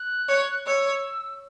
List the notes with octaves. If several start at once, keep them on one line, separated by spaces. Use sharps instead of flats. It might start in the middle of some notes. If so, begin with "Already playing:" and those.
Already playing: F#6
C#5
C#5 E6